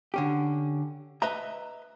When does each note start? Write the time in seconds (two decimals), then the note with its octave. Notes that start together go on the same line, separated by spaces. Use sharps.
0.14 D3 C#4 G4
1.22 B4 D#5 E5 A#5